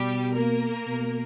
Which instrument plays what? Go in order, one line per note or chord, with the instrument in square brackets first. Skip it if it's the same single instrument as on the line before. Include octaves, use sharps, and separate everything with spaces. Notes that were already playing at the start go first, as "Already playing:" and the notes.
Already playing: [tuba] B2 [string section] G3 G4
[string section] A#3 A#4
[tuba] B2